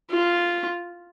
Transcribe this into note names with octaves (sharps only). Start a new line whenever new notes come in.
F4